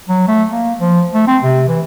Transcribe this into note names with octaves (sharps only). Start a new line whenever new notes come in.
F#3
A3
A#3
F3
A3
C4
C3
E3